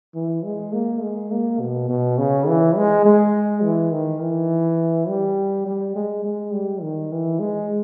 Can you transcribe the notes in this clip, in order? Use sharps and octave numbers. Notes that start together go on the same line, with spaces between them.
E3
G#3
A#3
G#3
A#3
B2
B2
C#3
E3
G#3
G#3
E3
D#3
E3
G3
G3
G#3
G#3
G3
D#3
E3
G#3